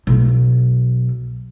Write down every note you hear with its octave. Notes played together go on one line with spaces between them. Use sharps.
B1